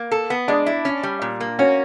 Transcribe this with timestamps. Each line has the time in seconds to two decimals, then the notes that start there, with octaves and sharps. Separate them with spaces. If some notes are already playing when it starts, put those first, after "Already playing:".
Already playing: A#3
0.12 A4
0.30 B3
0.48 G#3 D4
0.66 E4
0.85 C#4
1.03 G3
1.22 A#2
1.40 A#3
1.59 C#4 F#4